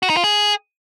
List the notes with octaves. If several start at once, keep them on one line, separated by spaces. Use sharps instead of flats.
F#4
D#4
F4
G#4